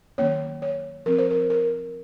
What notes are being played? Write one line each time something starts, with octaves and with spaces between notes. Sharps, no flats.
D#3 F#3 A#3 C#4 C#5
C#5
F3 C4 A#4
C5
A#4
A#4